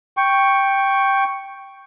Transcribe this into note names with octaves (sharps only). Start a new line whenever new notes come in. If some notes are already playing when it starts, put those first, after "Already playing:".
G5 C#6